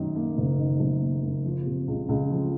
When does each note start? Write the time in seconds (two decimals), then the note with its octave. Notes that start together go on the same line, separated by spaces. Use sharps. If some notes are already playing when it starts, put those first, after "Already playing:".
Already playing: F#2 D#3
0.15 A#3
0.37 F#1
0.58 D#3
0.80 F#2
1.01 A#3
1.23 F#1
1.44 F3
1.66 C3
1.88 C#2
2.09 C#2
2.30 F3